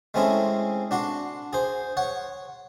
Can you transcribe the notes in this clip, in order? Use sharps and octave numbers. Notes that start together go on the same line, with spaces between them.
G#3 A3 C4 C#4 E4 G#4
D4 F#4 C6
G#4 C5
C#5 F#5